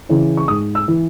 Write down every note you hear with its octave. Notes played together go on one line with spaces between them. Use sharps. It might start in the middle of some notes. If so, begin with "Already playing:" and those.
C#3 E3
C#6
G#2 D#6
E6
E3